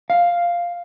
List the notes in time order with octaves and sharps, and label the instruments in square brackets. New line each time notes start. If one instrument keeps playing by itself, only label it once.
[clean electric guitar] F5